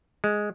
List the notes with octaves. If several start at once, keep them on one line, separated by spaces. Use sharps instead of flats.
G#3